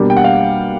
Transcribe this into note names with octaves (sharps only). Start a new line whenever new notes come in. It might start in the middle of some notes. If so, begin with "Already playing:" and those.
Already playing: B2 G3 A#3 D4
G5
F#5
F5